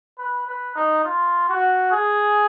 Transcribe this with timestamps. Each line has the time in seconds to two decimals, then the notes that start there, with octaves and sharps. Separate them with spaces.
0.18 B4
0.47 B4
0.75 D#4
1.04 F4
1.48 F#4
1.92 G#4